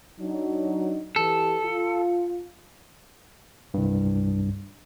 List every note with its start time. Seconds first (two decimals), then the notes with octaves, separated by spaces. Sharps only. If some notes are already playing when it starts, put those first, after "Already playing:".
0.20 F#3 D4 D#4
1.16 E3 G4 A4
1.65 F4
3.74 C2 G2